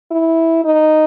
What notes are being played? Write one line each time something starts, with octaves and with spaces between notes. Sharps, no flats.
E4
D#4